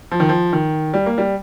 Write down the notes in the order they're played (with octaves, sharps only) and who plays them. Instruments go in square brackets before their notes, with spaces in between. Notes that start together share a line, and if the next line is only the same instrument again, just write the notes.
[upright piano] F3
D#3
F3
D#3
G3
A#3
G3